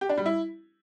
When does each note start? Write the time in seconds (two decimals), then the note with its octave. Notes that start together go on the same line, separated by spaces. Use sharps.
0.01 G4
0.09 D4
0.17 G3
0.26 E4